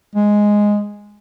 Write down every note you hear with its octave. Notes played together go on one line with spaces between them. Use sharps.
G#3